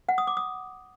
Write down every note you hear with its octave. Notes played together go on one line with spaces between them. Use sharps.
F#5
D#6
D6
D#6